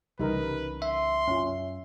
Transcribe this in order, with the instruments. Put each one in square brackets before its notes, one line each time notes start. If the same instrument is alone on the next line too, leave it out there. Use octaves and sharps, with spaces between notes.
[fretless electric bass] C2 C#3 E3 [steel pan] G3 D#4 A#4 [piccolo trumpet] B4
[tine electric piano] E5 [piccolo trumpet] C6
[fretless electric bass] F#2 [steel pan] C#4 F4